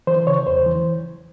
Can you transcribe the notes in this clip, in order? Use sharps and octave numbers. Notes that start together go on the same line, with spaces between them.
E3 C5
C#3 C#5
E2 C5
E3